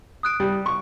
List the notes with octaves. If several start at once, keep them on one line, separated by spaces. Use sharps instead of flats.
D#6 F#6 D7
G3
C#6